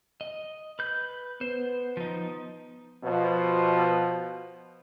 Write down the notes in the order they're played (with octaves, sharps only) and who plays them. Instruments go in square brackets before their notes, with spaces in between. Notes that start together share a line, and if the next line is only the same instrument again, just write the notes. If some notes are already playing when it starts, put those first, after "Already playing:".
[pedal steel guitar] D#5
B4 G6
[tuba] B3 [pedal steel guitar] C5
[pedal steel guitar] F3 D#4
[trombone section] B2 F3